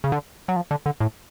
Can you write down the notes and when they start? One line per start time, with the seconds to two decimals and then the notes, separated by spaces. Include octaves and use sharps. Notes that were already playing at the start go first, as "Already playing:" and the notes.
0.04 C#3
0.12 D3
0.48 F#3
0.56 F3
0.71 D3
0.86 D3
1.00 A2